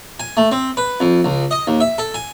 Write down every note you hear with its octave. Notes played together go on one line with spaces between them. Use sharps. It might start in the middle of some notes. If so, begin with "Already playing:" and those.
G#5
A3
C4
B4
F2
C#2
D#5
D#2
E5
A4
G#5